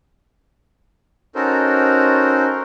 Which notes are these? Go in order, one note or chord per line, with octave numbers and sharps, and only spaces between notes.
C#4 D#4 F#4 A4 A#4 C5